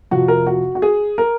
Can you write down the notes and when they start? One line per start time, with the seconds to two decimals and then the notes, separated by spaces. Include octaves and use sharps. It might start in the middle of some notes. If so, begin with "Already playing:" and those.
0.11 F2 C3 F3 F#4
0.28 A#4
0.47 F#4
0.75 F#4
0.82 G#4
1.18 A#4